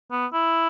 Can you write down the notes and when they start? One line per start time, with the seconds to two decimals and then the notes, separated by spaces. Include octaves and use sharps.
0.12 B3
0.33 E4